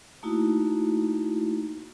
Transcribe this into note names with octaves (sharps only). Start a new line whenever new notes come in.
A3 A#3 D#4 E4 F#4